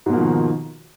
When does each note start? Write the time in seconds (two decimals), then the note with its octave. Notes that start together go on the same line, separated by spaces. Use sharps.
0.06 G#2
0.10 B2
0.13 A#3
0.16 F3
0.20 D#3